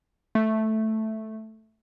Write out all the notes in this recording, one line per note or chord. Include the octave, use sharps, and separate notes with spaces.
A3